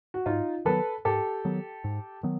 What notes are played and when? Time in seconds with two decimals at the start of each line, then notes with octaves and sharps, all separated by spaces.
0.14 F#4
0.26 G#2 D#4 F4
0.65 D#3 F#3 B3 A4 B4
1.05 G#2 G4 A4
1.45 D#3 F#3 B3
1.84 G#2
2.23 D#3 F#3 B3